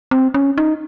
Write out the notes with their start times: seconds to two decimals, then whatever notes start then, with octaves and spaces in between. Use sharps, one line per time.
0.11 C4
0.34 C#4
0.58 D#4